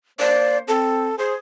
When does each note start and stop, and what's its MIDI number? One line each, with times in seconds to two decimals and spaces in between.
0.19 0.61 58
0.19 0.61 72
0.19 0.58 74
0.68 1.10 60
0.68 1.16 69
1.19 1.35 68
1.19 1.34 72